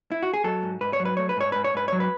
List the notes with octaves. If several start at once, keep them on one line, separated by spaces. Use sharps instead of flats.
E4
F#4
G#4
F#3 A4
G#2
G#2 B4
C#5
F#3
B4
A3 C#5
B4
G#2 C#5
G#2 B4
C#5
G#2 B4
F#3 C#5
B4